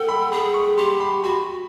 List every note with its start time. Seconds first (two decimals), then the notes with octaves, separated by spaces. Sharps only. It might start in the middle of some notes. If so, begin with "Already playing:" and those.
Already playing: A4 F#5 G5
0.09 B5
0.32 G#4 B5
0.54 C#6
0.78 G4 C6
1.00 B5
1.23 F#4 B5